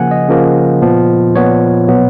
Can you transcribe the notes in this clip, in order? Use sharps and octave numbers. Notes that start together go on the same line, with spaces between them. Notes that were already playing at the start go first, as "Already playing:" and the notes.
Already playing: C#3 F3 A#3 F#5 G#5
D#5
C#3 F3 A#3
A#2 F3 B3
A#2 F3 B3 C#5
B2 F#3 B3